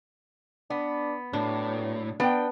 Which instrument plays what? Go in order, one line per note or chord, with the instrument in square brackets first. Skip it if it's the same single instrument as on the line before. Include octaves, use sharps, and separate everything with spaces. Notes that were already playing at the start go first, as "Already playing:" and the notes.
[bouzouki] B3 [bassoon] D4
[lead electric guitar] A2 [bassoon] F#3 [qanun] D4
[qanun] B3 [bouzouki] D4 G5